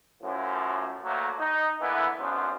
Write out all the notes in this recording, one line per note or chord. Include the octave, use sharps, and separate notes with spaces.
F#2 A2 F3
D2 F#3 A3 A#3
D#4
D3 E3 A#3 B3 E4
G#1 F#2 B3 C#4 D4 C5